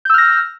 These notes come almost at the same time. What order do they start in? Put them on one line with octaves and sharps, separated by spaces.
G6 E6 F6 A#6